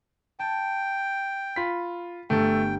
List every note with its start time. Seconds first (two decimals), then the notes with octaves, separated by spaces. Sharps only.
0.39 G5 A5
1.56 F4 B5 B6
2.30 G1 A3 A4 G5